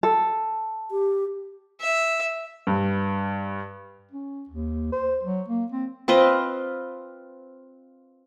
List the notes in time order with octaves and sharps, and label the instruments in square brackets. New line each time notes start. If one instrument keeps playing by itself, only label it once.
[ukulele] A4
[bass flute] G4
[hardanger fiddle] E5
[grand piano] G2
[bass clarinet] C#4
D#2
C5
F#3
A#3
C4
[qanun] C4 F4 B4 D#5